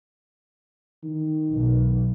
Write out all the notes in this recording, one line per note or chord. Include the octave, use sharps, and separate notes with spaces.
D#3
B1